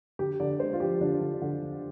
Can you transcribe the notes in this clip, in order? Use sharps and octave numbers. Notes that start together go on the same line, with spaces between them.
D3 G4
D3 D5
G#3 C5
F4
F3 G4
D3 D4
D3
D3
D3